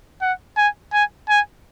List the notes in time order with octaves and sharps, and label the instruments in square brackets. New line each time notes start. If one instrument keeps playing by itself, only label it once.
[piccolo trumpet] F#5
G#5
G#5
G#5